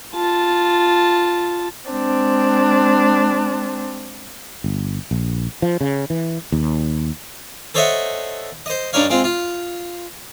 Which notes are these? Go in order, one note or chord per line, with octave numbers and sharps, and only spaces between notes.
F4 A5
G#3 C4 D4
G1
A#1
F3
C#3
E3
D#2
A4 C5 C#5 D#5 E5 F#5
C5 D#5
G2 D4 D#4 C#5 F5
G#3 C4 F4
F4